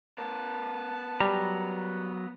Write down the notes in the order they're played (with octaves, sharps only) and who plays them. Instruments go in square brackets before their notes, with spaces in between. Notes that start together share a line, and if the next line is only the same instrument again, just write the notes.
[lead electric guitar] B3 A#4 [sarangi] A5
[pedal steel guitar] F#3 A#5 [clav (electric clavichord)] G3